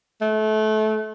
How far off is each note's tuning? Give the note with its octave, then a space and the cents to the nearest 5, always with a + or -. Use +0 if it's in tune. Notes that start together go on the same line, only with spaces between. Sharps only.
A3 -25